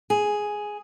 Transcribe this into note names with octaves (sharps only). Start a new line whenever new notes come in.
G#4